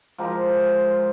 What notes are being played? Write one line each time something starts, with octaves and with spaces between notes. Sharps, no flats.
F3 G#3 G4 A#4